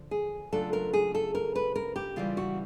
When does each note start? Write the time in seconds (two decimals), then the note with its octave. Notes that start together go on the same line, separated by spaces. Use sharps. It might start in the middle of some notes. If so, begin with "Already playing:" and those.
Already playing: D3 F3
0.11 G#4
0.52 C#3 F#3 A3 D4 F4 A4
0.73 A#4
0.93 G#4
1.15 A4
1.35 A#4
1.55 B4
1.76 A#4
1.96 G4
2.16 C#3 E3 G3 F4
2.37 F#4